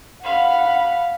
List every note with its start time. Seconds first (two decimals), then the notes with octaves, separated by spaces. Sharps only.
0.23 F5 F#5 B5